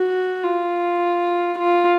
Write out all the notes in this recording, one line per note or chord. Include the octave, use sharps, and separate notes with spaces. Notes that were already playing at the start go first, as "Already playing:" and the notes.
Already playing: F#4
F4
F4